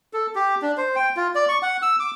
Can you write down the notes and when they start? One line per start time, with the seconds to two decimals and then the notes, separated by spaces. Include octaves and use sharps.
0.13 A4
0.35 G4
0.62 D4
0.77 C5
0.96 G5
1.17 F4
1.35 D5
1.49 C#6
1.62 F#5
1.82 E6
2.00 D6